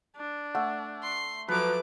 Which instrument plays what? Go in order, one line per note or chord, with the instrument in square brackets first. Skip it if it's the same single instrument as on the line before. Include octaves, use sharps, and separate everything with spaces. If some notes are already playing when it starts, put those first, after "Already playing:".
[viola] D4
[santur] A3 [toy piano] F#5
[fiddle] C6
[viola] F3 F#3 [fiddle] A3 D6 [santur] B4